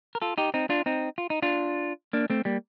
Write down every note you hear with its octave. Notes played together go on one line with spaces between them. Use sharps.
A#4
F4 A4
D#4 G4
C4 D#4
D4 F4
C4 D#4
F4
D#4
D4 F4
A#3 D4
A3 C4
G3 A#3